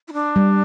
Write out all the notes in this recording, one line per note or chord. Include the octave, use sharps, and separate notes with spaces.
E4
D4
G3